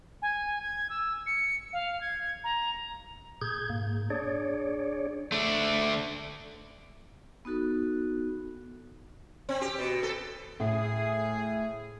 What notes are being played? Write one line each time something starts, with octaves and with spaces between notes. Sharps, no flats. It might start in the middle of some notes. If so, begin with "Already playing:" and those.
G#5
G#6
E6
C#7
F5
G#6
A#5
A#2 G#4 G6 G#6
G#2 A#3
D4 G#4 C#5 D5
A3 D4
B3 D#4 F#4 A4
C4
G4
B2
A4
A2 G#4